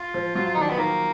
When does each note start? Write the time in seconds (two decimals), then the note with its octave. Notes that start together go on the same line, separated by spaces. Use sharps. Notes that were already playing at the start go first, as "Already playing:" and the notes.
Already playing: F4
0.14 F3
0.35 F#3 F4
0.46 F4
0.54 D#3 D#4
0.61 D4
0.70 B3
0.77 D#3 A#3